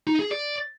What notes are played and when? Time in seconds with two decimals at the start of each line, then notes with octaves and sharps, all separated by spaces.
0.07 D#4
0.19 G#4
0.31 D5